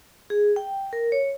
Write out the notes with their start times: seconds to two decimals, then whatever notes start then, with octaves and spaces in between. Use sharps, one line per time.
0.30 G#4
0.56 G5
0.93 A#4
1.12 C#5